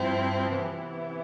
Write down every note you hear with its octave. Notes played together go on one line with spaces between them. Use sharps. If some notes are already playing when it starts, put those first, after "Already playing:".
Already playing: G2 F3 C4 E4
C3 E3 B3 E4